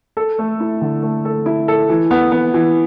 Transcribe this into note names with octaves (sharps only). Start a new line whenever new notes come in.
A4
A3
E4
D3
A3
A4
E4
A4
E3
B3
B3
E3